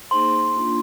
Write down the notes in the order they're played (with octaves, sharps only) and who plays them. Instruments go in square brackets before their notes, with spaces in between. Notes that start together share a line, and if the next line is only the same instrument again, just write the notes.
[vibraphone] A#3 D#4 G#4 C5 [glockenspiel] C6
[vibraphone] A#3 D4 F4